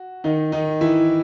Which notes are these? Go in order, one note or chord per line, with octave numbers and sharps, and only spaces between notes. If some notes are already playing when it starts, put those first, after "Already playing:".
Already playing: F#4
D#3 D#4
D#3 D#4
E3 E4